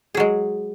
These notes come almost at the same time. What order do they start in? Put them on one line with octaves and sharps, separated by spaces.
G#4 F#3 G#3